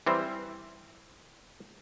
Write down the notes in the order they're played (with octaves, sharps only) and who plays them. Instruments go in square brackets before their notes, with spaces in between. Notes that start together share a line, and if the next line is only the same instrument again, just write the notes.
[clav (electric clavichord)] E3 G3 C4 C5